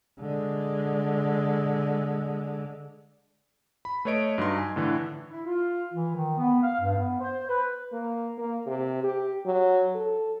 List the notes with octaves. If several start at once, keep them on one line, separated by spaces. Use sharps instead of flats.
D3 G#3
B5
A3 B4 C#5 D#5 D7
G2 F#3 D#4 C6
G#5
A2 D3 E3
E4
F4
E3
D#3
B3
F5
G2
B3
C5
B4
A#3
A#3
C3
G4
F#3
A4